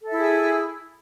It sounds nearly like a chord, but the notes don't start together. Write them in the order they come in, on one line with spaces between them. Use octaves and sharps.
A4 E5 E4 G#4